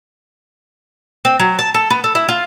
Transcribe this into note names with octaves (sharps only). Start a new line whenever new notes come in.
C4
F#3
A5
A4
B3
A4
E4
F4